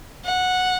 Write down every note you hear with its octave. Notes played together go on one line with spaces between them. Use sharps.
F#5